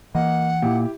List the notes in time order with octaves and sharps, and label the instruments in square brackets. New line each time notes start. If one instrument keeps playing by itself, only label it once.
[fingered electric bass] E3 [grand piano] A#3 D#5 [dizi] F#5
[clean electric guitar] A#2 [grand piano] E4 G4